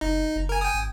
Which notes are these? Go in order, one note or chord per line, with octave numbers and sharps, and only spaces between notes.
F#1 D#4
F#1
A#4 G#5
G5 G#5 D#6
G#1